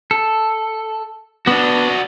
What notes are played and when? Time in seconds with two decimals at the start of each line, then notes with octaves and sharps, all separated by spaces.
0.11 A4
1.47 B3 D4 F#4 D5